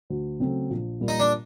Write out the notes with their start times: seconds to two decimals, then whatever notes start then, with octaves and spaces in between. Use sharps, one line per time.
0.10 D2
0.40 C#3 F#3 A3 C4
0.70 A#1
1.01 A#2 G3
1.08 D#4
1.20 D4